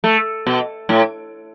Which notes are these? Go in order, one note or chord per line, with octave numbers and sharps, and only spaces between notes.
A3
B2
A2